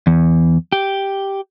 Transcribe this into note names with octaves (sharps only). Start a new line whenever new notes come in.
E2
G4